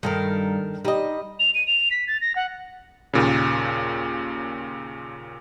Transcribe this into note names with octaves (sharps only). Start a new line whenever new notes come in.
G2 D#3 A4 A#4
G3 D#4 D#5
F7
D#7
F7
B6
A6
A#6
F#5
D#2 A#2 C#3